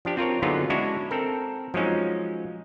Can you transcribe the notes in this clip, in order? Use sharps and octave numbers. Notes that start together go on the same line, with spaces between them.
F3 D4 G4
C4 F4 A#4 C#5
D3 F#3 B3 D#4 F4 G#4
G#3 C#4 D4 E4 F#4 C#5
C4 A4 A#4
F3 F#3 G#3 C#4 D#4